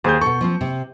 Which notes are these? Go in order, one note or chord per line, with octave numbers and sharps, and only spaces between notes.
D#2 G#4 C5 G6
B2 A4 C#6
F3 C4 F4
C3